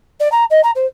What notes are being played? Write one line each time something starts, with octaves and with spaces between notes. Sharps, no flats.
D5
A#5
D#5
A#5
C5